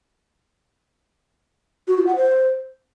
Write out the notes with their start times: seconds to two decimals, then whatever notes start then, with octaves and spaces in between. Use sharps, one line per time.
1.88 F#4
1.97 F4
2.07 F#5
2.16 C5